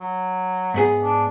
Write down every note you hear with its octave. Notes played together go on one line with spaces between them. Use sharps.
F#3
G#2 B3 G#4
D4